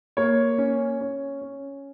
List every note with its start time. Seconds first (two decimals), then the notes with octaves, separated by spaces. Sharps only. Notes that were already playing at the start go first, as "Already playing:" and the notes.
0.17 A#3 C#5
0.58 C#4
1.01 C#4
1.41 C#4